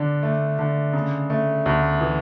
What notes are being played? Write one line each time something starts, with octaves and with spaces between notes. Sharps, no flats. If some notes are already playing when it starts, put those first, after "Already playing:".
Already playing: D3 D4
A3
D3
C#3
A3
D2
E3